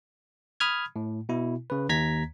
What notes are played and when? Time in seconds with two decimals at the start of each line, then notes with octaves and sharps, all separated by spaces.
0.60 B5 D#6 F6 G#6
0.96 A2
1.29 B2 E4
1.70 C#3 B4
1.89 D#2 A#5 G#6 B6